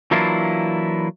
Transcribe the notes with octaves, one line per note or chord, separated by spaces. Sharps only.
E3 F#3 A#3 D4 E4 F4